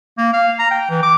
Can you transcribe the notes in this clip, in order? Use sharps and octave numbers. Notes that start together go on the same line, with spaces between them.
A#3
F5
A#5
G5
E3
D6